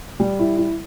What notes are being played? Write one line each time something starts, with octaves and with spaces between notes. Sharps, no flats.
G3
E4
E4